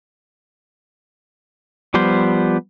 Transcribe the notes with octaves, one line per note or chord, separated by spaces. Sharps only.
F3 G3 B3 C5